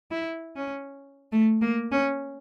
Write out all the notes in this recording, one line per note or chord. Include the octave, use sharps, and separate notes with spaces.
E4
C#4
A3
A#3
C#4